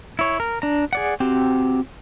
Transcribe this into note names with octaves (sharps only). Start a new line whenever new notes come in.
E4 C#5
A#4
D4 A#5
G#4 D5 F#5
C4 F#4 G4